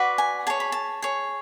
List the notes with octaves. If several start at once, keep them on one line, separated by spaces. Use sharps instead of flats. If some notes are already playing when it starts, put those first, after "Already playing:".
Already playing: F#4 B4 D5
G#5
G#4 C#5 A5
B5
A5
G#4 C#5